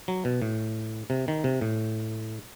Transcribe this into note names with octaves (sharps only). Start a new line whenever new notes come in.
F#3
B2
A2
C3
D#3
C3
A2